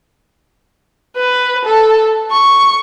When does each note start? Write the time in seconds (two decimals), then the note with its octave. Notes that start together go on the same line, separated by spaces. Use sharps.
1.16 B4
1.65 A4
2.31 C#6